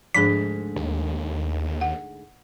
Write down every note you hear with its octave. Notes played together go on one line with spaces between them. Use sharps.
D2 G#2 F3 D4 G#4 B6
D#2
F#5